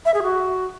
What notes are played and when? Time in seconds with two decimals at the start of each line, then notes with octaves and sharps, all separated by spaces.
0.05 E5
0.14 G#4
0.23 F#4